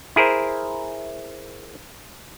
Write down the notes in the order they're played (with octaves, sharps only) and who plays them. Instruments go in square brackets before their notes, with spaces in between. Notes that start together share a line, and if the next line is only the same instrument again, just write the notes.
[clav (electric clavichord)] E4 G#4 A#4 C5